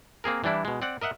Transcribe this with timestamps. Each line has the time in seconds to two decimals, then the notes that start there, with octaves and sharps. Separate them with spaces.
0.24 A#3 C4 G#4 A#4
0.44 E3 G3 D4 E4
0.65 B2 G#3
0.82 C4 D5 F#5
1.01 A#4 D#5 E5 F#5